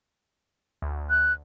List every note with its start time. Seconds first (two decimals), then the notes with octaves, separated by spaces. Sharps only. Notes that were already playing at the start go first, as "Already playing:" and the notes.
0.82 D2
1.10 F#6